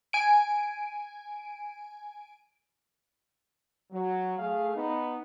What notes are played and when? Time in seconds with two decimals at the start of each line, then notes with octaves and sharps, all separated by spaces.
0.13 G#5 D7
3.91 F#3
4.38 A3 G#4 F5
4.76 B3 D#4